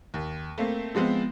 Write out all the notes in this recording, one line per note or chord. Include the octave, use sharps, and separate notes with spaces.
D#2
A3 A#3 C4
F3 G#3 B3 C4 F4